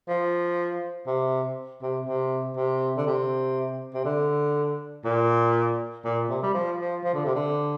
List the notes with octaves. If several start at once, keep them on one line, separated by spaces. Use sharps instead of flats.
F3
C3
C3
C3
C3
D3
C3
C3
D3
A#2
A#2
C3
G3
F3
F3
F3
D3
C3
D3